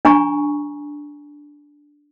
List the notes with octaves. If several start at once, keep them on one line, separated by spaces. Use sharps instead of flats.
D4 G#5 A#5 C#6